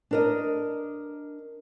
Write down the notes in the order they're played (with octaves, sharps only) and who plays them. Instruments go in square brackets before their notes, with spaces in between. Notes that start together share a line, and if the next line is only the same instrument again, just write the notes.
[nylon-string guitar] D4 A#4 D#5